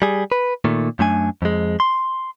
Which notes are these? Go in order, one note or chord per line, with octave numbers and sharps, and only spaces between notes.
G3 G#4
B4
A#2 D#3 A3
F#2 A3 D4 G#5
F2 G#3
C6